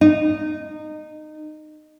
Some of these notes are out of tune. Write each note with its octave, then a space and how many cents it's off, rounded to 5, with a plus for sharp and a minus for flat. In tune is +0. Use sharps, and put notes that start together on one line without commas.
D#4 -20